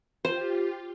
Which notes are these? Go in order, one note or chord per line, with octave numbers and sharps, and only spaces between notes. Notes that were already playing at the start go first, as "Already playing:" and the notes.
F4 G4 C5